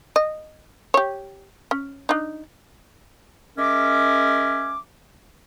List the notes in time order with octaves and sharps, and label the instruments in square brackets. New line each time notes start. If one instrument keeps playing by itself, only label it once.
[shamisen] D#5
G4 C#5
C#4
D4 D#4
[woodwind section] G#3 C#4 A#4 E5 D6